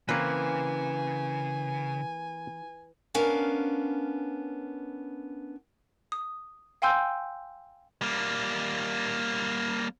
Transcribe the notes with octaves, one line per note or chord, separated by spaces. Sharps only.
C#3 E3 A#3 C4 B4 G#5
B3 C#4 D4 A#4 F5
D#6
F5 G5 G#5 C6 E6 G6
G3 A#3